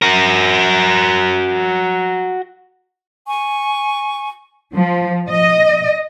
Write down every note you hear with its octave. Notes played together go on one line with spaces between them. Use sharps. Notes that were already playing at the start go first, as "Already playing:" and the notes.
F#4 A#4
G#5 C#6
F3
D#5